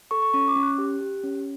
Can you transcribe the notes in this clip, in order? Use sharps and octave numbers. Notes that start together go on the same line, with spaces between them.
A4 C#6
C#6
C#4 C#6
D6
C#4
F#6
G4
G4
C#4